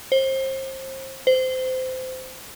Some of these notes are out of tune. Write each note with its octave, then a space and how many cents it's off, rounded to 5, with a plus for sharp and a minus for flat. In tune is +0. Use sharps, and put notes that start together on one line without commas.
C5 +30
C5 -20